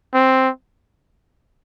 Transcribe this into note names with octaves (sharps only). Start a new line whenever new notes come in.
C4